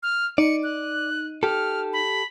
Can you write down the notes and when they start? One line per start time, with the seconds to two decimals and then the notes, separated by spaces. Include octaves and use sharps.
0.03 F6
0.38 D#4 D5 C#7
0.63 F#6
1.43 G4 A4 F6
1.93 B5